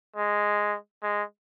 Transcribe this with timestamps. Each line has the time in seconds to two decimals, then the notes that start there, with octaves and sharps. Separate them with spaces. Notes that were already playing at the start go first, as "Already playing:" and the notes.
0.16 G#3
1.03 G#3